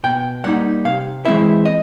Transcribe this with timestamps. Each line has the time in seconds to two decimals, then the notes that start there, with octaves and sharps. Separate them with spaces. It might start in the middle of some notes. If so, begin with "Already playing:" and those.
0.04 B2 G5
0.44 G3 A#3 D#4 F#5
0.85 C3 F5
1.25 E3 G#3 C4 E4 E5
1.65 D#5